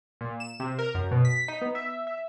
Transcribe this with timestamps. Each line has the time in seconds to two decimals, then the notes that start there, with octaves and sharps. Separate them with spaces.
0.21 A#2
0.40 E7
0.60 C3
0.79 A#4
0.95 F#2
1.11 B2
1.25 B6
1.48 D#4
1.61 B3
1.75 E5
2.07 E5